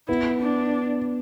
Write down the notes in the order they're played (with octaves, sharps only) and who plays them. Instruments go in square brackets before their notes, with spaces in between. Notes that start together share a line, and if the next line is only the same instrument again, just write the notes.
[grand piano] B3 [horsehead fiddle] E4
[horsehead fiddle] D4